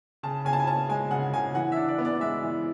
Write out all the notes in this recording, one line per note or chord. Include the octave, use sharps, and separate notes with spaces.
C#3 A5
C#3 G#5
A5
G#5
C#4 A5
G#3 G#5
C#3 F#5
C#3 G#5
E3 F#5
D4 E5
D5
B3
D5
G#3 E5
E3